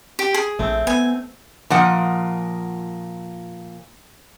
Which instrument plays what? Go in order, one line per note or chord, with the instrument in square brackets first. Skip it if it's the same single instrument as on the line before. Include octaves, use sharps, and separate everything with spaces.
[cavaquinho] G4
G#4
[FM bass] A#1 [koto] A3 C4
[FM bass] B3 [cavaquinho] G#5
[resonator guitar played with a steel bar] A#2 F3 F#5